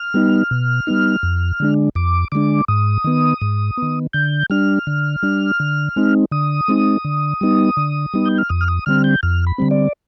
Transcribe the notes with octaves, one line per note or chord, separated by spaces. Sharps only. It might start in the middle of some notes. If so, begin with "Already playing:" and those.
Already playing: F6
G3 B3 D#4
B2
G3 B3 D#4
F2
D3 G#3 D4
F2 D6
D3 G#3 D4 D6
G#2 D#6
D#3 B3
G#2
D#3 B3
D3 G6
G3 D4 F6
D3
G3 D4
D3
G#3 C4 D#4
D3 D#6
G#3 C4 D#4
D3
G3 B3 D#4
D3
G3 B3 D#4
G6
F6
F2 D#6
F6
D#6
D3 G3 C4 F6
G6
F2 F6
B5
D3 G3 C4
D5